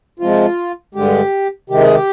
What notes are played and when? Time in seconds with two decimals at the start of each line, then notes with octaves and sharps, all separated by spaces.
0.20 C3 F3 G#3 F4
0.95 G2 D3 G#3 G4
1.70 C3 D#3 G#3 G4
1.82 G#4
1.94 G4